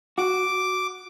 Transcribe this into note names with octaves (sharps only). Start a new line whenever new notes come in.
F#4 D6